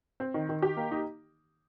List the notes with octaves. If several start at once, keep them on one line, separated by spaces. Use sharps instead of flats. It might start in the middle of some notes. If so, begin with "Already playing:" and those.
C4
D#3
D#3
G4
A#3
D#4